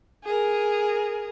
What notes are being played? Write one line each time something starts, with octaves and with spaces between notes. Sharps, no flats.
G#4 A#4